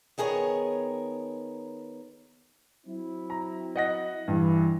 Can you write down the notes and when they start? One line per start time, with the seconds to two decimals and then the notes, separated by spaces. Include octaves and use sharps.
0.18 D#3 B3 G#4 A#4 C#5
2.86 F#3 C4 E4
3.30 A#5
3.76 D#5 F#5 A#6
4.28 G2 E3